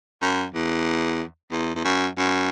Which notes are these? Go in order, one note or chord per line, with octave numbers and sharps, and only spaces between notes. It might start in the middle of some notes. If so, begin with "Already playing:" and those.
F#2
E2
E2
E2
F#2
F#2